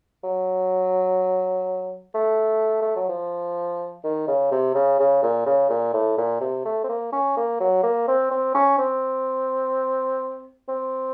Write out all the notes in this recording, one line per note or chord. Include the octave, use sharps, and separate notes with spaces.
F#3
A3
A3
F#3
F3
D#3
C#3
C3
C#3
C#3
A#2
C#3
A#2
A2
A#2
C3
A3
C4
A#3
C#4
A#3
F#3
A#3
C4
C4
C#4
C4
C4